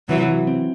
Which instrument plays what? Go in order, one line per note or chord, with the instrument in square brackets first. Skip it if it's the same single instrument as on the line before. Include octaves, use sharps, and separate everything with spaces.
[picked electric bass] C3 [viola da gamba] E3 F#3
[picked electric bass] E3
C4